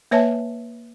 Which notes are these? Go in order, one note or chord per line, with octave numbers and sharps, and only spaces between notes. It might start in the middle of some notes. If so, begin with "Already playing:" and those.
A#3 B4 C#5 E5 G#5 A5